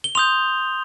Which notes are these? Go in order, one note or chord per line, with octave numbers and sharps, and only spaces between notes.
G7
C6 D#6 G6 F7